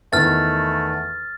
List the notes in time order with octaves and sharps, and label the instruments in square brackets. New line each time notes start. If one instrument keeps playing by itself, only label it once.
[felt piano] E2 D#3 [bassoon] A3 [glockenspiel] F6 A6